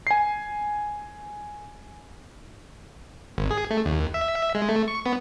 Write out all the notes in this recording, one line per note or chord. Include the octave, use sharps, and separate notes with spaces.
G#5 C7
G#1
G#4
A3
D#2
E5
E5
G#3
A3
C#6
B3